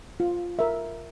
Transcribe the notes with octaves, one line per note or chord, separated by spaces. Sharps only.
F4
A#4 E5